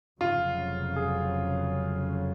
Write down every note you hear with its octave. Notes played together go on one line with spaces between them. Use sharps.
F1 F2 C#3 F#3 F4
G#4